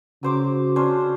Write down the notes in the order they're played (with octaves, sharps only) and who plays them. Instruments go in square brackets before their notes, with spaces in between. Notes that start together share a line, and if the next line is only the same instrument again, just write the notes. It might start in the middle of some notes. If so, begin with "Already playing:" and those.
[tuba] C#3 [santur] F#3 C5 D6
[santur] C#4 D4 C5